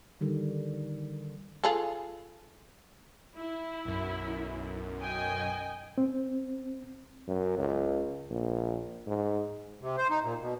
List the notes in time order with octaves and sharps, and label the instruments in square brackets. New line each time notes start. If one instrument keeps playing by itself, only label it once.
[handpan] D3 D#3 G3
[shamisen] F4 G#4 A4
[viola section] E4
[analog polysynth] B1 F#2
[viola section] D#5 G5 G#5
[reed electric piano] C4
[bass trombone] F#2
C#2
A#1
G#2
[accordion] C3
C5
D#4
A#2
B2